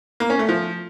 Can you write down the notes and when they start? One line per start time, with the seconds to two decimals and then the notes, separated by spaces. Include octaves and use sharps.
0.20 A#3
0.30 C#4
0.39 A3
0.49 F3